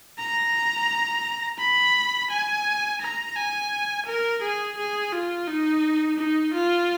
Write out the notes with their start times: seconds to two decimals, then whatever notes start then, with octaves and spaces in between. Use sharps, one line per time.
0.19 A#5
1.59 B5
2.31 G#5
3.01 A#5
3.36 G#5
4.06 A#4
4.42 G#4
4.78 G#4
5.13 F4
5.47 D#4
6.18 D#4
6.54 F4